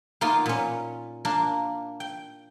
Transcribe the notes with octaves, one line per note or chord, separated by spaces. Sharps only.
A#3 B3 D#4 F4
A#2 C#4
A#3 D4 A#4
G5